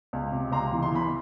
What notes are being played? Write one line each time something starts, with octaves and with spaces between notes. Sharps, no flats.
C#2
C3
C#2 A#5 C6
E3
C6
E3 B5